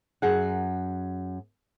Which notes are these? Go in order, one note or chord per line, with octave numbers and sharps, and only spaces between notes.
F#2 G#4 F#5